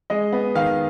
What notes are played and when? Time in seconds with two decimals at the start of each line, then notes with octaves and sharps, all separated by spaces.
0.10 G#3 D#5
0.32 B3
0.55 D#3 F5